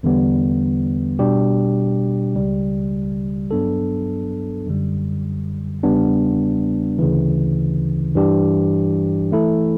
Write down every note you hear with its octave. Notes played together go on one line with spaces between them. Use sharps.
E2 D3 G3 B3
B2 G3 D4 G4
C#2 C#3 G3
G2 F#3 B3 D4 A4
F#2 D3 G3
E2 C#3 G3 B3 D4
D2 C#3 E3
G2 E3 G3 D4 G4
E3 A3 E4 A4